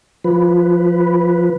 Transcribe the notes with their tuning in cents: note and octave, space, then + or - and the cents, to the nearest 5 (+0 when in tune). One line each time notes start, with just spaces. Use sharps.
F3 +0 B4 +0